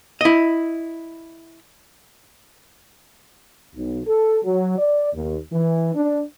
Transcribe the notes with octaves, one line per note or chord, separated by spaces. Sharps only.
E4 D#5
B1
A4
F#3
D5
D#2
E3
D4